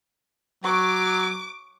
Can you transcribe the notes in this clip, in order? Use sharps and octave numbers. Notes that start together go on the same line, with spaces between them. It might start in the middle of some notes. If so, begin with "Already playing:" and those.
F#3 C#6 D6